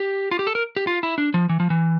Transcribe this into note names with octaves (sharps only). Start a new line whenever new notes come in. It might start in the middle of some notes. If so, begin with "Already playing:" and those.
Already playing: G4
F4
G4
A4
A#4
G4
F4
E4
D4
F3
E3
F3
E3